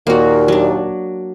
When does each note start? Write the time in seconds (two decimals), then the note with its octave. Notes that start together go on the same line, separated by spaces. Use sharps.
0.07 D#2 A#2 A#3 F#4
0.48 F#3 D4